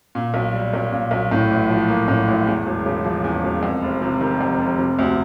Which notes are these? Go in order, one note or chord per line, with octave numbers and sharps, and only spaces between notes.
A#2
B1
G3
B1
A#2
B1
A2
A1
F3
A#3
A2
A1
E2
E1
C#3
F3
E2
E1
F2
F1
C3
D#3
F2
F1
C3
D2